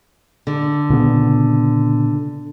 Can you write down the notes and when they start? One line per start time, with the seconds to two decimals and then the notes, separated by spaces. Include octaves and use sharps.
0.47 D3
0.90 A#2 C#3 B3